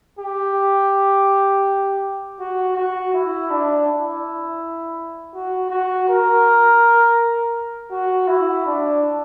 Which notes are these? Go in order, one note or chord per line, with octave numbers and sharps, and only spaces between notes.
G4
F#4
F#4
E4
D4
E4
F#4
F#4
A#4
F#4
E4
D4